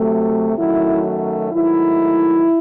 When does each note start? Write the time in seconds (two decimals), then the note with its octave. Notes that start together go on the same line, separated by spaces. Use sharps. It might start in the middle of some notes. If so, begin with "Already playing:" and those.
Already playing: C3 F#3 A3
0.55 F#2 D#3 F#3 A3 E4
1.51 G#2 D#3 F#3 A3 E4